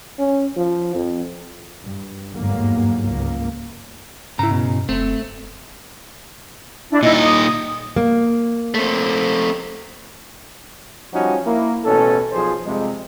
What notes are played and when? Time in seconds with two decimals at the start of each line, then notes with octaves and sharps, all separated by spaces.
0.19 C#4
0.56 F3
0.95 F2
1.84 G2
2.34 G1 E2 G#2 F#3 A#3
3.04 C#2 A#3
4.39 G#2 C#3 E4 A#5
4.51 G2 B2
4.89 F1 A3 C4
6.90 D4 E4
7.03 A#2 D#4 E4 D#5
7.16 D#6
7.96 A#3
8.74 A3 C4
11.13 F3 G3 C#4 D#4 F#4
11.45 A#3 E4
11.85 A1 B2 C#4 A4
12.33 B1 F3 G#4 C5
12.65 F2 C3 G3 G#3